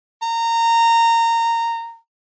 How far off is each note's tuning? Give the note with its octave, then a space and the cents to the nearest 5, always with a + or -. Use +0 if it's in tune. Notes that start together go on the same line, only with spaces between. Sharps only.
A#5 -20